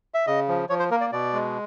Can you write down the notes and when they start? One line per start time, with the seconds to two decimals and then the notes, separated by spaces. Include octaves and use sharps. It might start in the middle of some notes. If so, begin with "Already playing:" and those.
0.14 E5
0.27 C#3 D#5
0.48 F3
0.69 F3 C#5
0.79 C5
0.90 A#3 A#4
1.01 D5
1.12 B2 D5
1.33 G#3